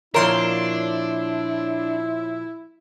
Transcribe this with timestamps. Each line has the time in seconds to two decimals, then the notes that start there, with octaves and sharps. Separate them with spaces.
0.14 A#2 F3 D4 E4 A#4 C#5 C6